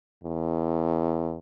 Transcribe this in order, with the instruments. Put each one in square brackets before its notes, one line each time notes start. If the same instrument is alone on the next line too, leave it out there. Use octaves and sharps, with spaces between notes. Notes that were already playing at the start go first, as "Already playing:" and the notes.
[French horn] E2